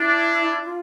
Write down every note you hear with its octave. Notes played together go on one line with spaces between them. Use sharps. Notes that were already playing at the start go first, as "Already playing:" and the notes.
Already playing: D4 E4
F4